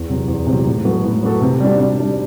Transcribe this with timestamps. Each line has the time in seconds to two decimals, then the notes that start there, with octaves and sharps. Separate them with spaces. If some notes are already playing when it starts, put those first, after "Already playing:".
Already playing: E2
0.09 C3 F#3
0.28 E2
0.47 C3
0.52 F#3
0.66 A2
0.84 F#3 B3 F#4 A4
1.04 A2
1.22 F#3 B3 F#4 A4
1.42 C3
1.60 G3 D4
1.79 C3
1.98 G3 D4